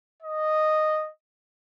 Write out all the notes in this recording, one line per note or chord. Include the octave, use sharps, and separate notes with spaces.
D#5